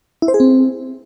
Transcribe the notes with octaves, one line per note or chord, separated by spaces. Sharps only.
E4
C5
G#4
C4